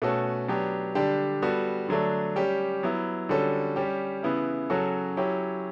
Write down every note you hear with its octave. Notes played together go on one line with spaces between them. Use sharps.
B2 A3 C#4 F#4 A4
F#3 B3 D4 G4
D3 G3 D4 G4
G3 B3 F#4 A4
D3 F#3 A3 D4
G3 C#4 G4
F#3 B3 E4
D3 G3 C#4 F#4 A4
G3 C#4 G4
C#3 E3 B3 E4
C#3 F#3 C#4 F#4 A4
F#3 C#4 E4 G4